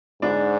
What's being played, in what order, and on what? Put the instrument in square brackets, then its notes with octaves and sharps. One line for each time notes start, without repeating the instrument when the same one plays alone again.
[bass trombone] G#2 [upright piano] D4